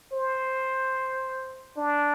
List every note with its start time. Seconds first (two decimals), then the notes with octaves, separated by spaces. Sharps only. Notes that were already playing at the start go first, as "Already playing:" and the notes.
0.13 C5
1.77 D4